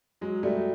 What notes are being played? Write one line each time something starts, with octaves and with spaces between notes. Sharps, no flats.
F#3 G#3
G3 A3